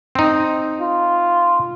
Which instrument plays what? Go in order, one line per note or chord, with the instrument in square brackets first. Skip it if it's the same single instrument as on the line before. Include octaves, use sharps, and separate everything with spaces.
[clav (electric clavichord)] C4 D#4
[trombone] F4